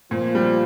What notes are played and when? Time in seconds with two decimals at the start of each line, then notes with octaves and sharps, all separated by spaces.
0.11 A#2 F3
0.35 G3